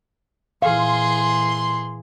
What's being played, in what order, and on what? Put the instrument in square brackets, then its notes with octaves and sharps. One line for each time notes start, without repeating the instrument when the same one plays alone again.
[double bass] A#2 E3 [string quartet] G#4 [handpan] F5 [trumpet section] C6